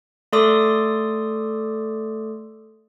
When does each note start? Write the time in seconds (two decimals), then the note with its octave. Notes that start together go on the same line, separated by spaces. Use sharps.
0.33 A3 A4 D5 C6 D6 D#6